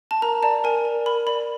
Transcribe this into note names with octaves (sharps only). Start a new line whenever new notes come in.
A5
A#4 A#5
D5 A5
A#4 G#5
A#4
A#4 B5
D5 B5